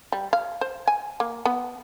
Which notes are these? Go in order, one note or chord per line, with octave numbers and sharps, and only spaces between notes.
G3
F5
C5
G#5
A#3
B3